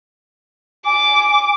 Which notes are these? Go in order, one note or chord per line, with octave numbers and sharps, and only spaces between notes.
G#5 D6